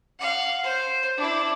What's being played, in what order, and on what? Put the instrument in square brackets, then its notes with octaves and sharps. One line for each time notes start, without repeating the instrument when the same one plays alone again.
[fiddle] F5 F#5
C5
D4 E4